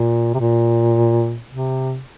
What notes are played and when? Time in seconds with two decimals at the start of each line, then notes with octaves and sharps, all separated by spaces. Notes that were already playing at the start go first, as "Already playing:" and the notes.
Already playing: A#2
0.34 C3
0.40 A#2
1.50 C3